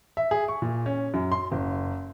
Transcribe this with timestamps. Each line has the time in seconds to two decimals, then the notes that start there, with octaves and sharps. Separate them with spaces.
0.17 E5
0.31 G#4
0.48 C#6
0.62 A#2
0.86 C#4
1.14 F#2
1.32 C6
1.52 F#1